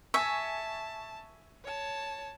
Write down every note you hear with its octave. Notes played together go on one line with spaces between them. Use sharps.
E5 G#5 A5 C#6
C#5 A5